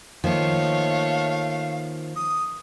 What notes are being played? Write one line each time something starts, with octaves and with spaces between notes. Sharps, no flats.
D#3 F3 A3 A#3 C#5 F5
D#6